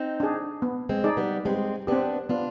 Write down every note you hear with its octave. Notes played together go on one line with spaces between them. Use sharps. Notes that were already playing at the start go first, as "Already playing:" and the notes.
Already playing: C4 D#4
D4 G#4
B3
G#3 C4
D#4 G#4 D5
G3 B3
G3 G#3 C4
B3 C4 D4 G4
B3 D4 F4